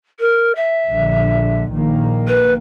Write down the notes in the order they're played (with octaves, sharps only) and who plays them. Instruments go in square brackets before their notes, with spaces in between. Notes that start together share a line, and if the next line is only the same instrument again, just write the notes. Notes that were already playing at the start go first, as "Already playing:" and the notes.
[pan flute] A#4
E5
[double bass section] A#1 D3
A#1 D#3 A#3
[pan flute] B4